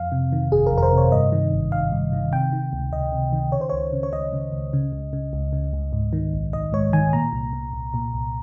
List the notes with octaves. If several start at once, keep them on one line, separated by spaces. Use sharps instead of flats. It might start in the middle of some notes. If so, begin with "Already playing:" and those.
Already playing: F2 F5
C3
D#3
G1 G#4
A#4
F2
A#4
C5
C3 C#5
G2 D#5
D#3
G#1
G#1 F5
G2
D#3
C3 G5
D#3
C#2
C#2 D#5
C3
D#3
C#3 C#5
C5
C#2 C#5
C#3
C#5
C#2 D#5
C#3
C#2
C#3
C#2
C#3
C#2
C#3
C#2
G#2
D#3
A#1
A#1 D#5
G#2 C#5
D#3 G#5
A#2 A#5
C2
A#2
C2
A#2
C2